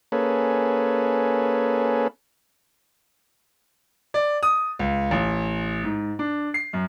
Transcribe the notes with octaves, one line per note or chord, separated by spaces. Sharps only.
A#3 C#4 G#4 A4 B4
D5
D#6
C#2
A1
G#2
D4
C7
F#2